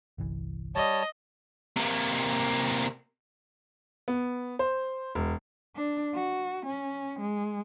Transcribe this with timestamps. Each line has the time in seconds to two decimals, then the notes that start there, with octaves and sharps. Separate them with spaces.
0.18 G1 C2 E3
0.75 G3 C#5 D#5 A5
1.77 C3 A#3
4.08 B3
4.59 C5
5.15 E1
5.76 D4
6.15 F#4
6.67 C#4
7.20 G#3